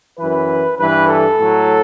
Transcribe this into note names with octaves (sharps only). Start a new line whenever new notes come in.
F#2 E3 B4
G2 E3 B4
A4
A2 F#3